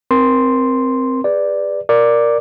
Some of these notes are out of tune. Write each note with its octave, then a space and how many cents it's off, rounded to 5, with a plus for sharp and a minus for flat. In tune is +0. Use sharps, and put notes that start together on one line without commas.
C4 +0 A#4 +20 C6 +0
G#4 -30 B4 +0 D5 +0
A#4 +0 D5 +0 D6 +0